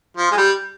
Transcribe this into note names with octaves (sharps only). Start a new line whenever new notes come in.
F3
G#3
G3